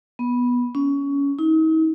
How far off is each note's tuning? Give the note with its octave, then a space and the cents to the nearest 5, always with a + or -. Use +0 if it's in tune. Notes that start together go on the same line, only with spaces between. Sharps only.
B3 -10
C#4 +20
D#4 +45